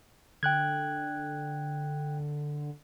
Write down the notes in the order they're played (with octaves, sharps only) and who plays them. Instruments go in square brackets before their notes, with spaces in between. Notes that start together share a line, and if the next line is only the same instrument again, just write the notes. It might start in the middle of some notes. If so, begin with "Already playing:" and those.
[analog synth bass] D3 [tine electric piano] G5 F#6 G#6